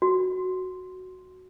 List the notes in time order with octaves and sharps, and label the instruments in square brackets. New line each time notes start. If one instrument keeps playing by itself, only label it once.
[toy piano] F#4